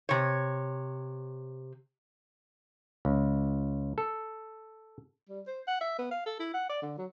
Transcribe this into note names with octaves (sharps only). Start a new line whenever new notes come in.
C3 C#5
C#2
A4
G3
C5
F#5
E5
B3
F5
A4
E4
F#5
D5
D3
F#3